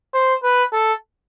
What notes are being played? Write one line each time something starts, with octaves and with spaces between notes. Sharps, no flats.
C5
B4
A4